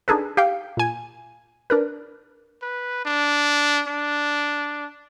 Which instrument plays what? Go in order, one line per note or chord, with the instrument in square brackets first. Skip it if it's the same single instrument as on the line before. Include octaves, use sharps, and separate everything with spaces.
[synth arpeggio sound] D4 D#4 G#4 A4 B4
G4 F5 G5
A#2 G#5
D4 A#4 B4
[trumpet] B4
D4
D4